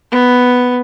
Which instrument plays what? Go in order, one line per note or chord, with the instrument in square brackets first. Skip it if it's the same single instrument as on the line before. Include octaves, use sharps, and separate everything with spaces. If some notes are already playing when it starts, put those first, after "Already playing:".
[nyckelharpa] B3